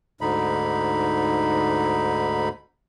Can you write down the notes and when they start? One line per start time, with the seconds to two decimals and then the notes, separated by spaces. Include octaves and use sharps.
0.21 D2 G#2 D3 D#4 B5